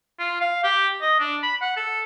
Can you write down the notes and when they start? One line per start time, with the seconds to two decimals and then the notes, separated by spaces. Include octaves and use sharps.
0.19 F4
0.41 F5
0.64 G4
1.01 D#5
1.20 D4
1.43 B5
1.62 F#5
1.77 A4